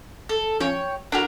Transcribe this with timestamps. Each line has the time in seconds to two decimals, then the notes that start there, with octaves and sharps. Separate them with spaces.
0.29 A4
0.60 F3 C#4 C#5 G5
1.12 D4 E4 F#4 A4 A#4